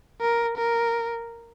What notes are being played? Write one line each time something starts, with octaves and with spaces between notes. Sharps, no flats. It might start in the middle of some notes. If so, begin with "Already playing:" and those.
A#4
A#4